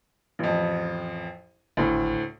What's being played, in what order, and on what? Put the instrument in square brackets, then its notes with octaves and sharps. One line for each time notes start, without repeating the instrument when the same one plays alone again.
[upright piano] A1 F2
[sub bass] G#1 [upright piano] D2 A2